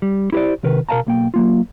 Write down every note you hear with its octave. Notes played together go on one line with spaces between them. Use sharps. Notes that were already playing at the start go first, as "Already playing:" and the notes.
G3
E4 G4 A#4 C5 D5
C3 D#3 A#4 B4
B2 A#4 D5 F5 A5 A#5
B1 A#3 G5
F#3 A#3 F4